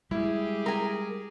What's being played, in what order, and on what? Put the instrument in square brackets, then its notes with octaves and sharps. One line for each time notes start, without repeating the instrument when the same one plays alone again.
[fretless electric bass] G3 G#3 [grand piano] E4 [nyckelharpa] G4 G#4
[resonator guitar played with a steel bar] A#4 G#5